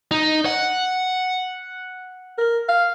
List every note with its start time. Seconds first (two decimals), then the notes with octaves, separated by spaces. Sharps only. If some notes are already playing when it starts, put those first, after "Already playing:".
0.11 D#4
0.46 F#5
2.38 A#4
2.68 F5